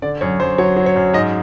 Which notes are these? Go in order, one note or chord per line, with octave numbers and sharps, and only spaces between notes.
D3 D5
F#2 C#5
F#2 C5
F#3 C#5
F#3
C#5
F#2
G#2 D#5